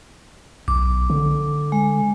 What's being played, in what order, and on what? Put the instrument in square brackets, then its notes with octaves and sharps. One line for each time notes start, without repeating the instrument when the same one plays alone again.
[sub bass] B1 [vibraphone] D6
[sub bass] D3
[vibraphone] G#3